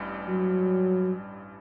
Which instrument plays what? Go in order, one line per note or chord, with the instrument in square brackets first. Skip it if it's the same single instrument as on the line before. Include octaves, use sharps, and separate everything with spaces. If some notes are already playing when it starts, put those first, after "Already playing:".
Already playing: [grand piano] A1 G2
[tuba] F#3